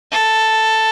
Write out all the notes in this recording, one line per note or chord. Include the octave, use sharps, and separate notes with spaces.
A4